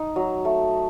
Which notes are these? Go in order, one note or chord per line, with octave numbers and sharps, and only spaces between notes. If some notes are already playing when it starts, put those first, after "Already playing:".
Already playing: D#4
F#3
A3